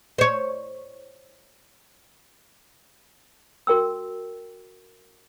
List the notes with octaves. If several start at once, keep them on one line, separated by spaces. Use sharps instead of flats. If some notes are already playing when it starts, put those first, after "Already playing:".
C5 C#5
F#4 A#4 G5 E6